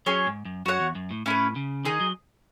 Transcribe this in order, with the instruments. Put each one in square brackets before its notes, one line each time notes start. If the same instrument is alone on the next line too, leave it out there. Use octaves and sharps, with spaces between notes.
[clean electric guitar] F#3 [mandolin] C#4 G#4 C#5
[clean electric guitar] G#2
F#2
[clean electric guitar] F#2 [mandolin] F#4 C#5 F#5
[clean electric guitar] E2
F#2
A2
[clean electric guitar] A2 [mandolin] C#4 E4 B4
[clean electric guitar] C#3
[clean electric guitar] D#3 [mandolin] D#4 G#4 D#5
[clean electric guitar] F#3